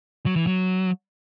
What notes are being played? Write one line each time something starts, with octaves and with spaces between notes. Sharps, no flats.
F#3
E3
F#3